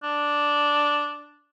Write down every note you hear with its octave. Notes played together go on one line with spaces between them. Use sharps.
D4